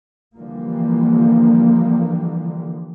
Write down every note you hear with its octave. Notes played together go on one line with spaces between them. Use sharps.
D3 E3 F3 G3 A#3